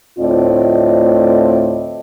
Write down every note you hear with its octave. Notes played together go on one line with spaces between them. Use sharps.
D2 A2 C4 F4 D5 D#5